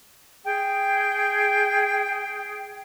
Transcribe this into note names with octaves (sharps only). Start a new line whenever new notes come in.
G#4 G5